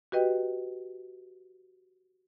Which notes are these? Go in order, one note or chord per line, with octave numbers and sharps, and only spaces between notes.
F#4 G4 B4 D#5 G5